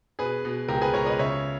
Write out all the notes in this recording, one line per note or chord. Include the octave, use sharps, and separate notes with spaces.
B2 G#4 B4
B2
C#2 G4 A#4
G#4 B4
C#2 A#4 C#5
B4 D#5
C#3 C#5 E5